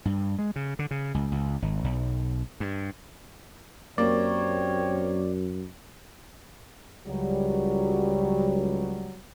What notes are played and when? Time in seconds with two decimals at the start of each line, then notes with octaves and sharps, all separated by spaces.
0.05 G2
0.39 G#3
0.56 C#3
0.79 D3
0.91 C#3
1.14 C#2
1.32 C#2
1.62 G#1
1.84 B1
2.60 G2
3.98 F#2 A#3 C4 G4 C#5 D5
7.07 C#2 F#3 G3